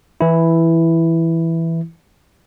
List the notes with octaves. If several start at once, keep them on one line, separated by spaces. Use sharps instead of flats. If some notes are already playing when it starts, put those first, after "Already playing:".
E3 E4